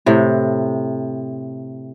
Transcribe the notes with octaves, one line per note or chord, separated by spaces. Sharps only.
A2 C3